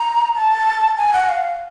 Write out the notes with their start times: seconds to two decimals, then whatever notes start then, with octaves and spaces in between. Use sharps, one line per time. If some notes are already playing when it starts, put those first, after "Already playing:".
Already playing: A#5
0.36 A5
0.97 G#5
1.13 F#5
1.29 F5